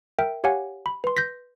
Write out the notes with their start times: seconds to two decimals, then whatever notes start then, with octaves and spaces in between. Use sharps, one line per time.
0.19 A#4 E5 G5
0.44 G4 C#5 F5 F#5 G#5
0.86 B5
1.04 B4 C6
1.17 G6 A#6 B6